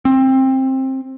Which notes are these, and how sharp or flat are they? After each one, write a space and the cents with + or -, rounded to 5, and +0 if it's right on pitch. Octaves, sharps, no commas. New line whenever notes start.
C4 +20